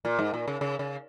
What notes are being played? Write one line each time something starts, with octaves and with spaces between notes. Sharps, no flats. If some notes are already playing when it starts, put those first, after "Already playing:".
A#2
G#2
A#2
C#3
C#3
C#3